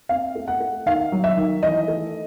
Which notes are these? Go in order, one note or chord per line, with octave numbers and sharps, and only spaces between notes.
C4 F5
A3
F#5
A3
D#3 F5
F#3
E5
D#3
E3 D#5
A3